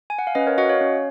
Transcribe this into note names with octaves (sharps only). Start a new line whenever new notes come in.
G#5
F#5
F5
C#4 B4 D#5
A#4 C#5
F#4 D#5 F#5
C#5 F5
C#4